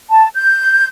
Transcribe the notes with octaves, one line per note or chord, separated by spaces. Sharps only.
A5
G6